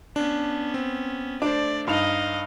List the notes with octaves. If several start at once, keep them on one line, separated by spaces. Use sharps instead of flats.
B3 C#4 D4
C4
A3 D4 C5 D5 D6
G2 D#4 D#5 F5 F7